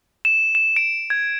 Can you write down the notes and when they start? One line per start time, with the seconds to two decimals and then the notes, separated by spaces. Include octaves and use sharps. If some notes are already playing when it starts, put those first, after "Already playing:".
0.25 E7
0.55 E7
0.76 D7
1.10 G#6